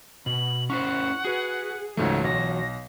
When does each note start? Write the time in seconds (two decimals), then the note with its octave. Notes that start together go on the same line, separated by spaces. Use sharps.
0.26 B2 F#7
0.70 C#4 E4 C5 F#5 C#6
1.25 F#4 G#4 B4
1.97 C#2 G#2 E3 A3 F#4 C#5
2.24 B1 A#6